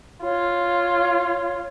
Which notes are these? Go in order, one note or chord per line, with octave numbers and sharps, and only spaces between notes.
F4 C#5